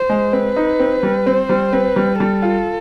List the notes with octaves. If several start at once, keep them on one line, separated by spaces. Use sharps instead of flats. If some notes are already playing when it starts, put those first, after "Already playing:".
Already playing: C5
G#3
C4 B4
D#4
C4
G3
C4 C5
G3
C4 B4
G3
G3 A4
F4